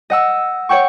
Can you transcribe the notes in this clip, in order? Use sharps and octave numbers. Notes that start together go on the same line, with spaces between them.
D#5 F#5 E6
C#5 F#5 G5 C#6